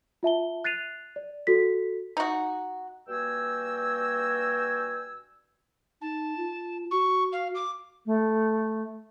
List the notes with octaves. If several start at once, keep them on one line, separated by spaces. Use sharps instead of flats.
F4 E5 A5 G7
F#6 A6 C7 D#7 F7
D5
F#4 A4 B6
D#4 F#4
G2 A#3 F#4 G5 G#5 E6
D#4 A5
F4
F#4 C#6
F5
D6
A3